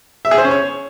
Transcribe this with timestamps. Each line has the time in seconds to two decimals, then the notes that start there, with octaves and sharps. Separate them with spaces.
0.25 E5
0.31 G#4
0.38 C5
0.45 C#4
0.51 C#5